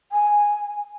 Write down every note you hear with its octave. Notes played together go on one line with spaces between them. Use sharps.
G#5